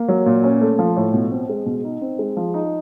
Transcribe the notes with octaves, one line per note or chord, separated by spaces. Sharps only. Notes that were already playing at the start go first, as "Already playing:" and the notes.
Already playing: A#3
F#3
A#2
C#4
A3
F3
A2
B2
C4
G#3
B2
D#4
C4
G#3
F3
D#4